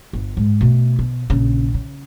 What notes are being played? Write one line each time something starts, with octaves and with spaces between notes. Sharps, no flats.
G1
G#2
B2 A3
B2
A#1 C#3
C#3